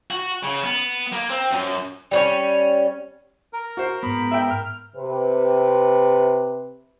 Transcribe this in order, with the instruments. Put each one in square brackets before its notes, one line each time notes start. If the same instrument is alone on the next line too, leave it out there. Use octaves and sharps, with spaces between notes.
[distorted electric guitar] F#4
C#3
B3
A#3
C4
F#2
[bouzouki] G3 B3 C#4
[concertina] A#4
[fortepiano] F#4 C5
[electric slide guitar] G#2 B3 [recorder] B5
[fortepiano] E5 G5
[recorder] F6
[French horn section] C3 B4